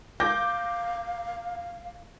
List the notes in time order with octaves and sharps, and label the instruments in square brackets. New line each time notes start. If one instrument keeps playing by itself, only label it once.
[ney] F5 [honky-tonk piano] D6 G6 A#6